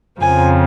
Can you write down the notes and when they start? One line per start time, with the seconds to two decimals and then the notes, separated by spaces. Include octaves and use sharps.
0.20 F2 C#3 F3 G#5